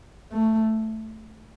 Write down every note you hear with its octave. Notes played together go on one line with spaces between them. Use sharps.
A3